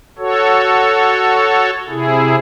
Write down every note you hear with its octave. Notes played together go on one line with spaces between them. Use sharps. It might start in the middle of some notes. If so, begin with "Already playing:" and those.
F#4 A4 C#5
C3 E4 G#4